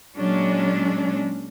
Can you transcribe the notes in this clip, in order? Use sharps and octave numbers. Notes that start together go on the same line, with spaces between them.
A#2 F#3 G#3 C#4 D4